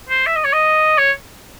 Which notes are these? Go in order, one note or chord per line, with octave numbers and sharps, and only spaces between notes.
C5
E5
D#5
C#5
D#5
C#5